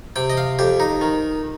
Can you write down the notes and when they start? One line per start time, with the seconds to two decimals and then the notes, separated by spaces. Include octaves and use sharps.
0.16 C3 G5
0.30 D#5
0.37 F5
0.59 F2 G4
0.80 D#4
1.01 D#3